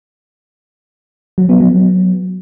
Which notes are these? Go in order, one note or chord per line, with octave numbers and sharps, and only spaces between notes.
F#3
B3
F#3